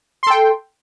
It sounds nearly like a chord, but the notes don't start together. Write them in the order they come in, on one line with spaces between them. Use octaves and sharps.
C6 A4 G5